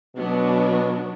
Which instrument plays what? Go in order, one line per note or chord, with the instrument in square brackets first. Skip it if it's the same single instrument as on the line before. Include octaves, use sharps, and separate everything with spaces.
[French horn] B2 [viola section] F#3 B3 D4